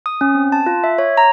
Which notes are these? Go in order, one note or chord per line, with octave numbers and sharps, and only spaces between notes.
D#6
C#4
C4
A5
F4
E5
C#5
A#5